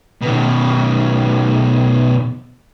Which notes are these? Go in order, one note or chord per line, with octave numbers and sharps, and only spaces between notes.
B2 D#3